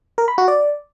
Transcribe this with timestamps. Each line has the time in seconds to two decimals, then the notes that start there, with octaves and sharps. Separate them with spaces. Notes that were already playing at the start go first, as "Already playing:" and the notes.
0.18 A#4
0.28 B5
0.38 F#4
0.48 D5